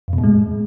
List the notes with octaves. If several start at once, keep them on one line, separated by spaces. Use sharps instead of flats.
F2
B2
A2
G#3